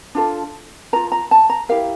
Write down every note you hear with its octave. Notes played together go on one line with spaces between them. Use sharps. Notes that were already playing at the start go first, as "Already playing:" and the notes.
D4 F4 A4
F4 A#4 A#5
A#5
A5
A#5
E4 G4 A#4 F5